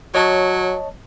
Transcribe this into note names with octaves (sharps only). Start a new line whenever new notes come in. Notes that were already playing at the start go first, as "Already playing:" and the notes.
F#3 C#5 D#5 A5